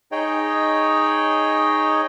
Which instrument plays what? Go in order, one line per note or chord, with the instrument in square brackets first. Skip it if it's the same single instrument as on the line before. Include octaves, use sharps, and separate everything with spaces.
[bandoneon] D#4 G#4 C#5 D#5 G5